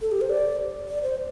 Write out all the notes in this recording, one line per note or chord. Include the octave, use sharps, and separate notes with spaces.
A4
G4
C5
D5
D5
C5